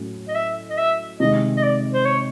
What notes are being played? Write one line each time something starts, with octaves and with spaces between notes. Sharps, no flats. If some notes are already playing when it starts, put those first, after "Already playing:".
Already playing: A2 F#3 A3 C#4
D#5
E5
D#5
E5
C3 D#3 G#3 D#5
D#5
D5
C5
C#5